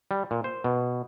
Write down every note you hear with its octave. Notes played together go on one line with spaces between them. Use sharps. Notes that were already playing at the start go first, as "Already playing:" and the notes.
G3
A#2
C5
B2